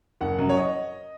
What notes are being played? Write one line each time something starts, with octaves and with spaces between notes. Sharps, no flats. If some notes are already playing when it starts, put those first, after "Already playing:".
F#1 F#5
F#2
C#5
D#5